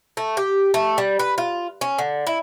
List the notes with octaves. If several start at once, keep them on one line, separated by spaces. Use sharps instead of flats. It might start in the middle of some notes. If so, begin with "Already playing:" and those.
A3
G4
A3
G3
B4
F4
C#4
D3
E4